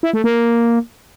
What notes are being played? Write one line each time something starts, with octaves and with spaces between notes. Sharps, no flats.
E4
A3
A#3